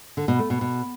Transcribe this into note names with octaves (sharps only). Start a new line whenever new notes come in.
D3
B2
A3
B2
B2